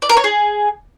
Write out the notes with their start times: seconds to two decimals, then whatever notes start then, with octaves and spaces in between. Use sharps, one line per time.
0.02 D5
0.09 A#4
0.17 C#5
0.24 G#4